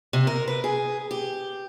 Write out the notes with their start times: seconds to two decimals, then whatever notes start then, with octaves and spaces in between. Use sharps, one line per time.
0.13 C3
0.27 A#4
0.48 B4
0.64 G#4
1.11 G4